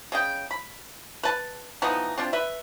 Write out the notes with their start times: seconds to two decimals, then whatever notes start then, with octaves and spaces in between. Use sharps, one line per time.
0.12 C#3 D#5 G5
0.51 B5
1.23 B4 A5
1.82 E3 F3 B3 D#4
2.18 C4 D4 F4
2.33 B4 E5